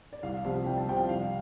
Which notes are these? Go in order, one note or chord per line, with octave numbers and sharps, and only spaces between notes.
D5
C2 F5
C3 F3
C2 G5
A5
C3 F3 G5
C2 F5